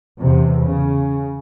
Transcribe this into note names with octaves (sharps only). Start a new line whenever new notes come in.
E2 C3
C#3